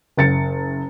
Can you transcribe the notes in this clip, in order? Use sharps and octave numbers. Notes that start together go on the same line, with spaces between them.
F#1 A6 C#7